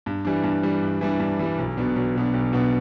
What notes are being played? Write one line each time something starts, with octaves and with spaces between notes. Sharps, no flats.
G2
E3 G3 D4
G2
E3 G3 D4
G2
E3 G3 D4
G2
E3 G3 D4
B1
B2 B3 D4
B1
B2 B3 D4
B1
B2 B3 D4